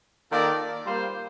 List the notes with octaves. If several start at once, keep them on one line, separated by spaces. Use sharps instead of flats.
D#3 A#3 F4 A4 D5
G3 A#3 F4 C5